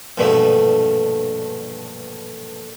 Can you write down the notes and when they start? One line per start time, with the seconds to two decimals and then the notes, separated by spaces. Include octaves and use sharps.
0.18 A#1 E2 G2 B2 D3 A3